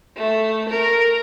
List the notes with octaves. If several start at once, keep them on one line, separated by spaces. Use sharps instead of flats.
A3
A#4